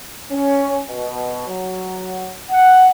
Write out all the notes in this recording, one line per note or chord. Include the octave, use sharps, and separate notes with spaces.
C#4
B2
F#3
F#5